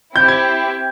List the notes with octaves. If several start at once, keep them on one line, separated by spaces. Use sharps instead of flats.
C4 E4 G4 G6
G#6